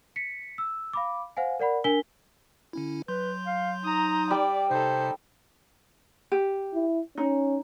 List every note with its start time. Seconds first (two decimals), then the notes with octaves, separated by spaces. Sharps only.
0.16 B6 C#7
0.58 E6
0.93 F5 B5 D6
1.37 C5 F5 F#5 G#5
1.60 A#4 D5 F#5 B5
1.84 D4 A#4 G#5 B6 G7
2.73 D3 C#4 E4
3.08 F#3 B4 C6 G6
3.46 F5
3.84 D#4 A#5 D#6
4.31 G3 D5 G5
4.71 C3 D#4 A4 C5
6.32 G4
6.74 E4
7.17 C#4 D#4